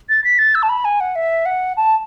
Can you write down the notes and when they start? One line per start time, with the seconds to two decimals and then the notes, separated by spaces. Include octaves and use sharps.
0.09 A6
0.24 B6
0.38 A6
0.55 E6
0.63 A5
0.69 B5
0.85 G#5
1.00 F#5
1.15 E5
1.46 F#5
1.77 A5